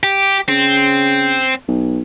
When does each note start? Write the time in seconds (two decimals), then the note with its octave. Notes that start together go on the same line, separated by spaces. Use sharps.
0.03 G4
0.48 C#3 C4
1.68 B1